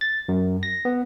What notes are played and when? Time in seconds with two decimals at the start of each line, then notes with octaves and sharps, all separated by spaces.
0.01 A6
0.29 F#2
0.63 A#6
0.85 B3